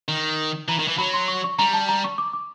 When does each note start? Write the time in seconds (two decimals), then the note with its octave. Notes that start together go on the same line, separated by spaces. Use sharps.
0.08 D#3
0.68 E3 A#5
0.79 D#3
0.88 E3
0.98 F#3 B5
1.13 C6
1.28 C#6
1.44 C#6
1.59 G3 A#5
1.73 A5
1.89 A#5
2.04 C#6
2.18 D6
2.33 D6